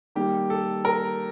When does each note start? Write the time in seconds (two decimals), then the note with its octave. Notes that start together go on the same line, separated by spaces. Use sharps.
0.15 D#3 G3 A#3 D#4 G4
0.50 A4
0.85 A#4